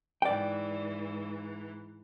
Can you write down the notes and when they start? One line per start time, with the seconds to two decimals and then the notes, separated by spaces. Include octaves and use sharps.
0.22 G#2 E3 D5 G5